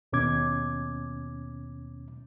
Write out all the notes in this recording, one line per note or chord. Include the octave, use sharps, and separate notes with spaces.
D#2 B2 C#4 D6 G#6